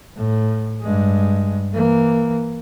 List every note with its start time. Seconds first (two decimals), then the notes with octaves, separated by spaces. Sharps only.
0.16 A2
0.82 G2 G#3
1.74 E3 A#3